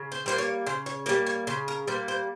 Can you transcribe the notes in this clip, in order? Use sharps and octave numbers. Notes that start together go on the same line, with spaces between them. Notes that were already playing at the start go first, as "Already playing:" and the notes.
Already playing: C#3
C5
G3 A#3 C5
C#5
C#3 C5
C#5
G3 A#3 C#5
C#5
C#3 C5
A#4
G3 A#3 C5
C5